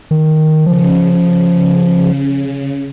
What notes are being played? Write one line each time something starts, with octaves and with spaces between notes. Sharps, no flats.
D#3
C#3 F3